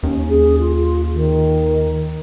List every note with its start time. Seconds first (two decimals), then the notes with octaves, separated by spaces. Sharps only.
0.03 D#2 C#4
0.29 G#4
0.59 F4
1.13 D#3